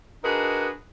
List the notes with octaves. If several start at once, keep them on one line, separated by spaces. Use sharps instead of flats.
D4 D#4 F#4 G#4 A#4 B4